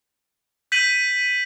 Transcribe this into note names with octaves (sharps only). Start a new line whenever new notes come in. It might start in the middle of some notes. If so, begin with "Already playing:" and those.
G6 B6 D#7 F#7